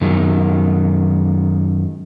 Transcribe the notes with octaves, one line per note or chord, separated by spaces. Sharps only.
F#2 D#3 G#3